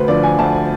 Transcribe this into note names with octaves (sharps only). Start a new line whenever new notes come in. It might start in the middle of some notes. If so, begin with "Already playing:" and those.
Already playing: D2 B4 C5
D3 F3 D5
G#5
D2 A5